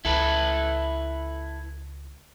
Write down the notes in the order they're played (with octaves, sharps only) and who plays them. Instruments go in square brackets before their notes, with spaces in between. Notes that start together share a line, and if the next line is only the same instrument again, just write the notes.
[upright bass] C#2 [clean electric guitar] E4 A4 B4